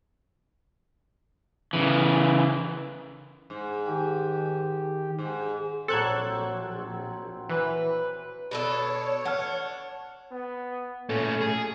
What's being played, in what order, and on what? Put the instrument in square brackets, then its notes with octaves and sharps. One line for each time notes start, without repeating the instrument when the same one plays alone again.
[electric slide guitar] C#3 E3
[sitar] G#2
[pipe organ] D#3 G4
[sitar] G#2
[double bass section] A#1 [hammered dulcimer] F#3 C4 [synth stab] A4 F#6 G#6
[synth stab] E3 [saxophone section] B4
[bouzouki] B2 D4 A4 [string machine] C#5
[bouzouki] D4 [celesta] F#5 A5 F6
[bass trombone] B3
[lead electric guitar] A#2 A3 [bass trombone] C#4 [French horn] A4
[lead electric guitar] G#4